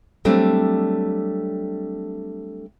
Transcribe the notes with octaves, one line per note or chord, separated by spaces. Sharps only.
F#3 G3 A3 C4 D4